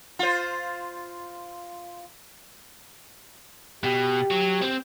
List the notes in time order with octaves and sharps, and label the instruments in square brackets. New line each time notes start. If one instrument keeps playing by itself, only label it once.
[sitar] F4 C5
[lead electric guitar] B2 [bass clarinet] G4
[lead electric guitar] F#3
C4